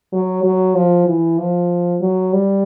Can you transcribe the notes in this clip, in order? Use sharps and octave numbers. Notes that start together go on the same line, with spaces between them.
F#3
F#3
F3
E3
F3
F#3
G3